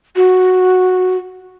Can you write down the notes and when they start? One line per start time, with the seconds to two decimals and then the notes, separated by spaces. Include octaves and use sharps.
0.16 F#4